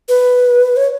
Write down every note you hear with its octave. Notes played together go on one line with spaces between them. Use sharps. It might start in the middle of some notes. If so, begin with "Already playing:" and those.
B4
C#5